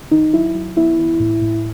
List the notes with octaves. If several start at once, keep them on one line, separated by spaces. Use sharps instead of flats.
D#3 D#4
F#3 E4
F#3
B3 E4
E3
A2
A2